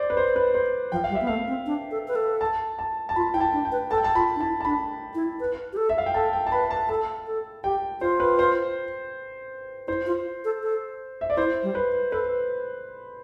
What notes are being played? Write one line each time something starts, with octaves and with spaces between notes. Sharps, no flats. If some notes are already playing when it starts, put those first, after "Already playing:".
Already playing: C5 D5
B4
C5
B4
C5
F3 G5
F5
G3
E5
B3
A3 F5
C4
D4
A4
B4
A4
A5
A5
A5
F4 B5
E4 G5
A5
D4
G5
B4
A4 A5
G5
A5
F4 B5
D4
E4 A5
A5
D4 B5
E4
B4
G4
A4
E5
F5
G5
A4 A5
G5
A5
B4 B5
A5
A4 A5
A4
G4 G5
F4 C5
B4
C5
E4 C5
F4
A4
A4
E5
D5
E4 C5
G3
B4
A4 B4